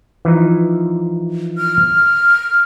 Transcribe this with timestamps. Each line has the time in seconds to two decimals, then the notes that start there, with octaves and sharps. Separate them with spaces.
0.25 E3 F3 D#4
1.58 F6